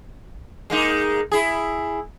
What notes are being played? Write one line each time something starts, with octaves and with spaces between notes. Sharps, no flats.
G#3 A#3 D#4
E4 G#4